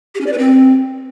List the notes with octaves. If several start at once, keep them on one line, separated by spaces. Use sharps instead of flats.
G4
C#4
D5
B4
C4